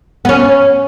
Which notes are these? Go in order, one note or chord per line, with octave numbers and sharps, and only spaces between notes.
B3
C#4